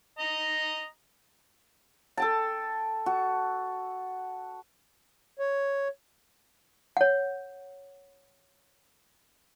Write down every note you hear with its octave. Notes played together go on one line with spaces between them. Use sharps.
D#5 A#5
A4 G5 A5
F#4
C#5
C#5 F#5